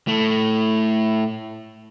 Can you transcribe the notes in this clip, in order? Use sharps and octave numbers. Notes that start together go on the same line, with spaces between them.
A2 A3